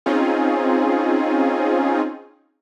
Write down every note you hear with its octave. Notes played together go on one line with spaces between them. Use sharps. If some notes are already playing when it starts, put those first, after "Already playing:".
C4 C#4 D#4 F4 G#4